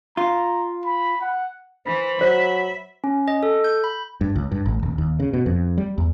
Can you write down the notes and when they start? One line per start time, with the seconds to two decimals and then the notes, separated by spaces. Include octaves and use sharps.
0.17 F4 A#5
0.86 B5
1.21 F#5
1.86 E3 C5 B5
2.21 F#3 C5 E5
3.04 C#4
3.28 D#5
3.43 A4
3.64 G6
3.84 B5
4.21 G2
4.36 C#2
4.52 G2
4.66 A1
4.83 D#1
4.98 D#2
5.20 C#3
5.33 B2
5.46 F2
5.78 G3
5.98 E2